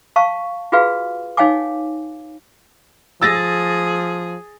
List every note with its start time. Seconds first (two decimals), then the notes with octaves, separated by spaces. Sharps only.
0.16 F5 A5 C#6
0.72 F4 F#4 G#4 B4 F5
1.37 D#4 C#5 F5 G5 G#5 D6
3.22 F3 G#4 E6 A6 A#6